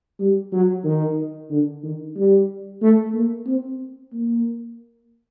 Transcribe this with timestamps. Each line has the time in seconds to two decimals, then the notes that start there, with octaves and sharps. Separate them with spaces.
0.20 G3
0.52 F#3
0.84 D#3
1.50 D3
1.83 D#3
2.16 G3
2.82 A3
3.14 A#3
3.46 C4
4.13 A#3